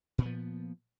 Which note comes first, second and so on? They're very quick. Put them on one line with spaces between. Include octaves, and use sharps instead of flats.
A#2 B3 F3